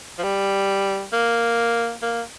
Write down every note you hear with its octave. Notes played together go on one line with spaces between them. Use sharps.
F3
G3
A#3
A#3